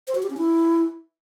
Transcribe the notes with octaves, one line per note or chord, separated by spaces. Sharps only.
C5
F#4
G4
C#4
E4